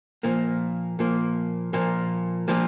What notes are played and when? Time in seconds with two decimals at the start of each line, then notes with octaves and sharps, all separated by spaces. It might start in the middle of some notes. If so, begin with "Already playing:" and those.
0.23 A#2 F3 A#3
0.99 A#2 F3 A#3
1.73 A#2 F3 A#3
2.48 A#2 F3 A#3